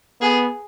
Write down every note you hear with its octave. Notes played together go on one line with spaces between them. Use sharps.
B3 G#4